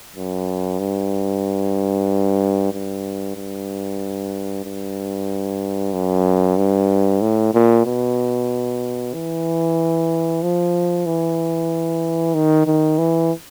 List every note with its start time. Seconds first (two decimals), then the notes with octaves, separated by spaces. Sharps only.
0.16 F#2
0.80 G2
2.73 G2
3.36 G2
4.65 G2
5.93 F#2
6.57 G2
7.22 A2
7.54 A#2
7.86 B2
9.14 E3
10.42 F3
11.06 E3
12.35 D#3
12.67 D#3
12.99 E3